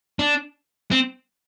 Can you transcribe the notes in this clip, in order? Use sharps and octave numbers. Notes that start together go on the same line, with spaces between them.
D4
C4